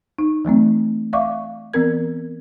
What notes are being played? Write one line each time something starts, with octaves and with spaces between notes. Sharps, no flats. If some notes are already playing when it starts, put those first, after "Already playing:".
D#4
E3 F#3 A3 C4
D5 E5 F5 C#6 D6
E3 B3 C4 A#4 G#6